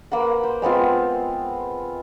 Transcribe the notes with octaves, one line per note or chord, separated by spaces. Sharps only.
A#3 B4 F#5
C5
G#3 B3 C4 F4